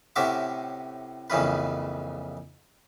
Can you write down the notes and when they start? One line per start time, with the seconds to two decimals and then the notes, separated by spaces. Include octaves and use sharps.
0.16 A2 C3 C#4 F#4 E5 D6
1.30 A#1 F2 C#3 E3 C#4 B4